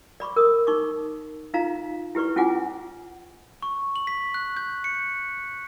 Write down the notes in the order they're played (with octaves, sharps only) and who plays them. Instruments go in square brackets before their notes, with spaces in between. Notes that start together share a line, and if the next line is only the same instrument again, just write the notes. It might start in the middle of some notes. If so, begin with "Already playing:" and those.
[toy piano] D5 B5 C#6 D6
A#4 D#6
D#4 C#6 D6
D#4 F4 F5 A#5
E4 G4 B4 D5 C#6
C#4 E4 F4 F#5 G#5 D6
[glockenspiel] C#6
F#7
B6
F#6
G6
C#7